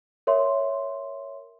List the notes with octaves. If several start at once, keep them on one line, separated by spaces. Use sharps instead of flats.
A#4 C#5 E5 C6